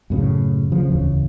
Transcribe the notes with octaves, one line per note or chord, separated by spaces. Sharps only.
F#2 A2 C#3
C#3 F3
D1 E2 C#3